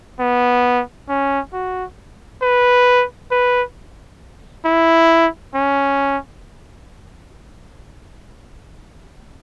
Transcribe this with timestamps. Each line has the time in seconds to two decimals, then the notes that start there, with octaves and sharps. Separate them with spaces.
0.19 B3
1.09 C#4
1.53 F#4
2.42 B4
3.31 B4
4.65 E4
5.55 C#4